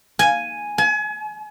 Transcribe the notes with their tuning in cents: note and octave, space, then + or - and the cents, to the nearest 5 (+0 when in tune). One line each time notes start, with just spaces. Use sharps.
G#5 +0
G#5 +35